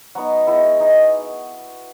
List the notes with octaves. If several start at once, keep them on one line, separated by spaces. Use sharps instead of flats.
F#3 B3 D#4 F#4
G#3 B3 E4
G#3 D#4 G#4